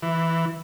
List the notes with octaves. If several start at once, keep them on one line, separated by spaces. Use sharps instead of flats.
E3